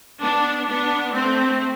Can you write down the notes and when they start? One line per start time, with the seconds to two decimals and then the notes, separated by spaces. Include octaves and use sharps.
0.21 B3 D4
0.69 B3 D4
1.14 A3 C4